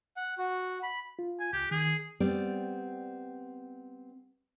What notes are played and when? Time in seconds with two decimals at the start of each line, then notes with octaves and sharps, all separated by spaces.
0.17 F#5
0.38 F#4
0.83 B5
1.19 F4
1.40 G#5
1.53 C#2 G4 F#6
1.71 D#3 G#4
2.20 G3 B3 C4 D5